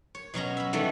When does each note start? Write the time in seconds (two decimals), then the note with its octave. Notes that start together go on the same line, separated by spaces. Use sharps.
0.15 C#5
0.34 B2 F#3 C#4 A#5
0.57 E5 B5
0.73 D#3 E3 G3 A3